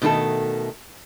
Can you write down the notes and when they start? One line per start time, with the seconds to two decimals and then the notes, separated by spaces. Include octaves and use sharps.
0.02 B2 D#3 A3 D#4 A4